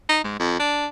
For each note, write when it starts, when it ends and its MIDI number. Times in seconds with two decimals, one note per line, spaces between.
0.09 0.21 63
0.24 0.34 44
0.39 0.57 41
0.60 0.86 62